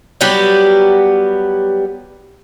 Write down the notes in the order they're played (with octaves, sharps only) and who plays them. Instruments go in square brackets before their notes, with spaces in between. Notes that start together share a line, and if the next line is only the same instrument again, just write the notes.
[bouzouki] F#3 G3 B3 G4